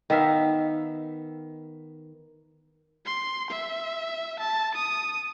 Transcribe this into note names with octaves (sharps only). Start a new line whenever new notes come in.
D#3 B3 E5 F5
C6
E5
A5
D#6